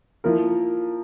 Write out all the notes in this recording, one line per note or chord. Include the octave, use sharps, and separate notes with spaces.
F3 A#3 E4 A#4